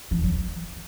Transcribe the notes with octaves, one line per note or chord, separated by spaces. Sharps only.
E3
F#3